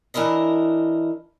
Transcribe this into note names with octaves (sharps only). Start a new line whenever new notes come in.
E3 D4 E4 A#4 D#5